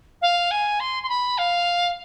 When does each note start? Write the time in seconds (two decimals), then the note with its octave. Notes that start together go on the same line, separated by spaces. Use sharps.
0.21 F5
0.51 G#5
0.80 C6
1.03 C6
1.09 B5
1.38 F5